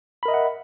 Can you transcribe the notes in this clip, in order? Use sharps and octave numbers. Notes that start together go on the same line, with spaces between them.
A#4 D#5 E5 F#5 B5